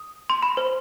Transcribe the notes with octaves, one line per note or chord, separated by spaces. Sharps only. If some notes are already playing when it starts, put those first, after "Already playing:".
Already playing: D#6
C6
B5
C5